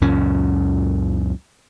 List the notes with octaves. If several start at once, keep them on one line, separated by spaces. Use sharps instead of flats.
C#2 F#2 A#2 C#4